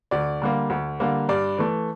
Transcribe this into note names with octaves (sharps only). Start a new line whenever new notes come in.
D2 D5
D3 G3 A#3
D2
D3 G3 A#3
G2 D5
E3 A3